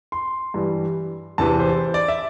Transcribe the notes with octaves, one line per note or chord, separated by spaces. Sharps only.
C6
G2 E3 G3
E2 C3 E3 A5
C5
D5
E5